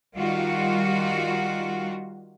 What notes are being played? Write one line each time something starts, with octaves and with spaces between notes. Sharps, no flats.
D#3 G3 F4 F#4